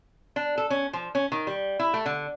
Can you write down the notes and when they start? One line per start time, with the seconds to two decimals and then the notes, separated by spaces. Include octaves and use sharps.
0.36 D4
0.58 A4
0.70 C#4
0.93 F3
1.15 C#4
1.32 D#3
1.47 G3
1.79 E4
1.94 A3
2.06 D3